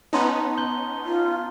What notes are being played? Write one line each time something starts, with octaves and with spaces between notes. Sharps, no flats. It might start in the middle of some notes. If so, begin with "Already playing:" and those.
B3 C#4 D#4 A5 A#5 C6
C6 G6 G7
F4